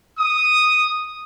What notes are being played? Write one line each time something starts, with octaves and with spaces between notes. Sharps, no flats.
D#6